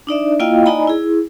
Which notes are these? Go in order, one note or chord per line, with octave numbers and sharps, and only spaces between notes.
D4 D#4 D5 E5
A#3 E4 F4 D#5 F5 G5
D#4 D5 D#5 G#5 A#5 B5
E4 G#4